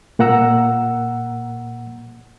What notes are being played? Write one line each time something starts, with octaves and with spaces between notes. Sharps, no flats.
A#2 A#3 F#5 A#5 E6